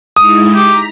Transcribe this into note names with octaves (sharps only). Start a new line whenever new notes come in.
G#3 D#4 E4 D#6
G4 A#5 B6